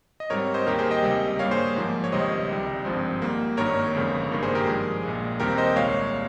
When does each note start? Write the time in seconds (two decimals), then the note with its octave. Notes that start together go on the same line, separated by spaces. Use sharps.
0.20 D#5
0.30 G#2 G3 C4 A#4 C#5
0.54 C5 D#5
0.67 D#2 D#3 A#3 G4 A#4
0.79 G#4 C5
0.91 D#5 G5
1.03 C#2 C3 G3
1.39 G2 G3 A#3 C#5 F5
1.51 G#4 C5
1.76 G#1 G#2 F3 A#3
2.04 C#5
2.12 C#2 C3 D#3 G3 C5 D#5
2.49 C2 C3 G3
2.85 G#1 G2 F3 G#3 C4
3.22 G#2 G3 A#3
3.57 G#1 G2 D#3 A#3 A#4 C#5
3.95 G1 F2 C#3 G#3
4.30 G#1 G2 D#3 A#3
4.42 G#4 C5
4.55 G4 A#4
4.66 G2 F3 G#3 G#4
5.03 A#1 A#2 G#3
5.40 D#2 D#3 G3 C4 G4 A#4
5.58 C5 D#5
5.76 C2 A#2 G#3 C#5 F5